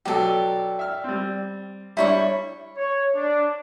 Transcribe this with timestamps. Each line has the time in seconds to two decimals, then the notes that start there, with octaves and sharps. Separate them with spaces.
0.05 B2 F#3 G4 A4 D5
0.79 E5 F6
1.04 G3 C4
1.97 G3 D4 E4 C#5 C#6
2.76 C#5
3.15 D4